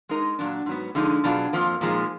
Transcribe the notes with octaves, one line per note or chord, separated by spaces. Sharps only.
G#3 D#4 A#4 D#5
A#2 F#3 D4
G#2 F#3 B3
D3 F3 G#3 D#4
B2 F#3 D4 F4 G#4
F2 F3 A#3
A#2 F3 G#3 D#4